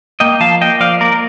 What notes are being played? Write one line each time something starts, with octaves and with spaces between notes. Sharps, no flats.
A#3 D#5 G5
F3 F5 A5
A#3 D#5 G5
F3 D5 F5
A#3 A#4 D5